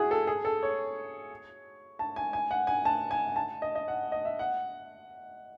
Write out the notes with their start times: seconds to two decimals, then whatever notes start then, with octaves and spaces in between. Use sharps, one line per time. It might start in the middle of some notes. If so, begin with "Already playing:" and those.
Already playing: E4 F#4 G#4
0.11 A4
0.27 G#4
0.45 A4
0.63 C#5
1.99 A5
2.16 G#5
2.33 G#5
2.51 F#5
2.67 G#5
2.85 A5
3.11 G#5
3.36 A5
3.62 D#5
3.75 D#5
3.88 F#5
4.12 D#5
4.25 E5
4.39 F#5